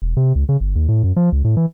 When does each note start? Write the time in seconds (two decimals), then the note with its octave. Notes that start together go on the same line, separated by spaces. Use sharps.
0.02 E1
0.17 C3
0.35 C#2
0.49 C#3
0.61 G1
0.75 D#2
0.88 A2
1.04 F#2
1.16 F3
1.32 C#2
1.44 A2
1.57 E3